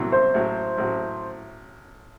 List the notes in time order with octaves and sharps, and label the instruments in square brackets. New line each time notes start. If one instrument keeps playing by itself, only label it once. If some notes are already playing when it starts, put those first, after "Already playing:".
Already playing: [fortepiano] C2 B2 F#3 C4 E4
[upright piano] C5
[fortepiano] A1 A2 F#3
A1 A2 F#3